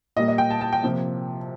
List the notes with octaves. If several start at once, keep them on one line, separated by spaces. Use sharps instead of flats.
A#2 G3 A#3 D#5
D#5
G5
A5
A5
G5
C3 F3 A#3